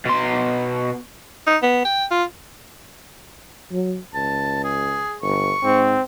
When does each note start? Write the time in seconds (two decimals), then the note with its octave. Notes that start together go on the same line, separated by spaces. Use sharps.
0.05 B2 C6
1.47 D#4
1.63 B3
1.85 G5
2.11 F4
3.72 F#3
4.14 C#2 A5
4.64 G#4
5.22 G1 C#6
5.63 G#2 C4